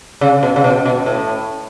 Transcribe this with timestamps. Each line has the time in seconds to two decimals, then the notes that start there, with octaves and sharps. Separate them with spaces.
0.21 C#3
0.43 B2
0.56 C#3
0.64 B2
0.85 B2
1.06 A2